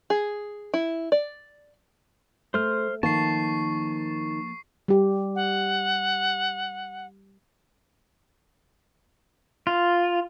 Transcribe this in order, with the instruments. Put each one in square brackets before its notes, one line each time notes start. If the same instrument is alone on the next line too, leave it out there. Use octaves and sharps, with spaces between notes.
[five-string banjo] G#4
E4
D5
[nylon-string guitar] A3 [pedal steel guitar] C5 F6
[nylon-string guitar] D#3 [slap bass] F3 A#3 [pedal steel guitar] A5 [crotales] C#6 C7
[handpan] G3 G4
[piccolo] F#5
[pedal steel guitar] F4